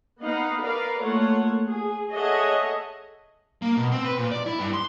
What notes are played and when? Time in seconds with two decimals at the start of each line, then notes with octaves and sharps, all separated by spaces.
0.21 B3 D#4 D#5 F5 F#5 B5
0.62 A#4 B4 D5 F5
1.00 A3 A#3 F4 A4 C#5 F#5
1.68 G#4
2.12 G#4 A4 C#5 D#5 E5 F#5
3.62 A#3
3.77 B2
3.92 C4
4.05 B4
4.18 A#2
4.31 D5
4.46 E4
4.59 G2
4.73 C6